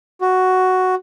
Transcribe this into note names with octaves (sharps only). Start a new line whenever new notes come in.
F#4